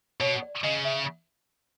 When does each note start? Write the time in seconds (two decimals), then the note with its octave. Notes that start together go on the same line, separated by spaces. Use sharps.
0.21 B2 C#5
0.42 D5
0.63 C#3 D#5
0.85 E5